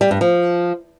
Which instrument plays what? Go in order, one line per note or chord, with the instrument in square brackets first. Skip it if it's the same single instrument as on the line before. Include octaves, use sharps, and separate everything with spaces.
[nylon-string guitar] G3
G2
F3